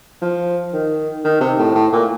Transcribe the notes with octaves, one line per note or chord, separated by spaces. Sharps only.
F3
D#3
D#3
C3
A2
A2
A#2